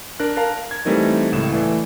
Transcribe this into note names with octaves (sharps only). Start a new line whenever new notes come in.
D4 A#4 F#6
A#4 F5 A5 A#5
G#6
E3 G3 A3 C4 D#4 A#4
C#2 A2 E7
E3 A3 D5